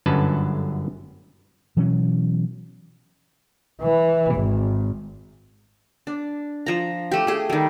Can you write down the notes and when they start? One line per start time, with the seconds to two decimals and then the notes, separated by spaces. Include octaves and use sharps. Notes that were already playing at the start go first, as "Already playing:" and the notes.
0.06 G1 F#2 D3 C#4 B4 A5
1.77 B2 E3 F#3 C#4
3.82 E3
4.35 G#1
6.07 D4
6.66 F3 A#5
7.11 A3 G4
7.27 A3 G#4
7.50 D#3 G3